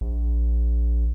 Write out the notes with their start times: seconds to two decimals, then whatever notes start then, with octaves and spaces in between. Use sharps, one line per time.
0.01 A#1